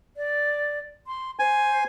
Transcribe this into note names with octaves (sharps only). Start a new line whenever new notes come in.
D5
C6
C5 G#5